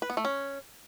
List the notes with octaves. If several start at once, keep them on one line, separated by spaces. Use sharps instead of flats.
B4
B3
A3
C#4